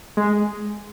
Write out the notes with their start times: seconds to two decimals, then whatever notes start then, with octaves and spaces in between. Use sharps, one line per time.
0.17 G#3